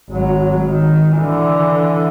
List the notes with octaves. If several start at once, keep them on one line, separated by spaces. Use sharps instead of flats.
G#1 F#3
D#3
D3 E3